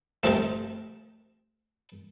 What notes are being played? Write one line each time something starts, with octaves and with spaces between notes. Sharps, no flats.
C3 D#3 F3 A3